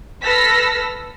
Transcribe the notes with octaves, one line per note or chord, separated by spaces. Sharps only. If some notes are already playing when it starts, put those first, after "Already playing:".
A4 B4 E6 F6 A#6 B6